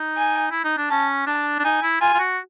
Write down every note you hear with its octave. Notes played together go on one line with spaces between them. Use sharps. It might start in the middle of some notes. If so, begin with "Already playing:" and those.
Already playing: D#4
G#5
E4
D#4
D4
C#4 A5
D4 A5
D4
D#4 G#5
E4
F4 G#5
F4
F#4